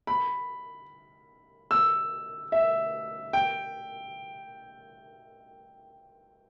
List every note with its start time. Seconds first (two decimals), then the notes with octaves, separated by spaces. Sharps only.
0.07 B5
1.71 E6
2.52 E5
3.33 G5